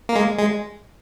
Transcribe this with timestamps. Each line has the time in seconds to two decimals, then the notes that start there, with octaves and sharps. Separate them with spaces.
0.09 A#3
0.16 G#3
0.39 G#3